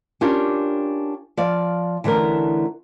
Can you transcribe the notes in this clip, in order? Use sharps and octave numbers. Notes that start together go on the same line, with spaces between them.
C#4 D4 F4 G4 A#4
F3 D5 F5
D3 E3 A3 C#4 A#4